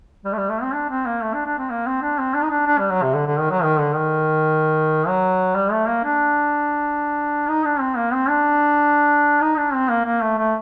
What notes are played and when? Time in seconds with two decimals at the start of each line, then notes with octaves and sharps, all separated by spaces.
0.25 G3
0.33 A3
0.38 G3
0.50 A3
0.62 C4
0.74 D4
0.90 C4
1.06 A#3
1.22 A3
1.34 D4
1.46 D4
1.58 C4
1.70 A#3
1.86 C4
2.02 D4
2.19 C4
2.34 D4
2.43 D#4
2.51 D4
2.67 D4
2.79 G3
2.91 F#3
3.03 C3
3.15 D3
3.27 D3
3.39 D#3
3.51 F#3
3.63 D#3
3.79 D3
3.95 D#3
5.08 F#3
5.56 G3
5.72 A3
5.88 A#3
6.04 D4
7.49 D#4
7.65 D4
7.80 C4
7.97 A#3
8.13 C4
8.29 D4
9.41 D#4
9.57 D4
9.74 C4
9.90 A#3
10.05 A#3
10.21 A3
10.38 A3